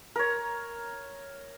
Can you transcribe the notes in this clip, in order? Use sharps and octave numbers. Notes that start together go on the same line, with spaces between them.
A#4 C#5